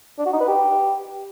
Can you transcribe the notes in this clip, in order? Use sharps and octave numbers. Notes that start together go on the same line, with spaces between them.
D4
F#4
D#4
B4
G4